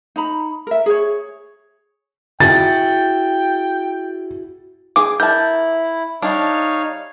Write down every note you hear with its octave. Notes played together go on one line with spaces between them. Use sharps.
D#4 A#5 B5
A#4 E5
G#4 C#5
E4 F#4 G#4 G5 A6
G#4 G#5 D6
E4 A#4 A5 G6
G3 D4 D#4 C#5 F5